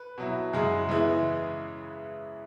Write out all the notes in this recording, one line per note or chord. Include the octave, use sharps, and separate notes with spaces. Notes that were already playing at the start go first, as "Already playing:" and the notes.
Already playing: B4
B2 F#3 E4
F#2 C#3 G#3 E4 G#4
C#3 E3 G#3 B3 E4